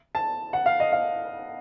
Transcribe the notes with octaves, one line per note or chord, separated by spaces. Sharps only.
A5
F#5
F5
D#5
F5